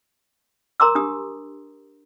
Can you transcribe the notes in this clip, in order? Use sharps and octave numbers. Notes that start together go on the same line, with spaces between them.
A#4 A#5 C6 D6 E6
D4 G4 D#6